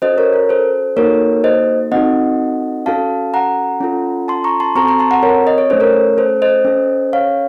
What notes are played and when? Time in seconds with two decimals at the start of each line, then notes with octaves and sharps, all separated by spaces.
0.02 C#4 F#4 A4 C5 D#5
0.18 A#4 C#5
0.33 A#4
0.49 A4 C5
0.97 A#3 D#4 F#4 A4 A#4 C#5
1.44 C5 D#5
1.92 C4 D#4 F#4 A4 D#5 F#5
2.86 C#4 F#4 A4 F5 A5
3.34 F#5 A#5
3.81 C#4 F4 A4
4.28 A5 C6
4.44 A#5 C#6
4.60 A5 C6
4.75 C4 F#4 A4 A#5 C#6
4.88 A#5 C#6
4.99 A5 C6
5.11 F#5 A#5
5.23 A#4 C#5
5.47 D#5
5.58 C#5
5.70 A3 C#4 A4 C5
5.80 A#4 C#5
6.18 A4 C5
6.42 C5 D#5
6.65 C#4 A4
7.13 C#5 F5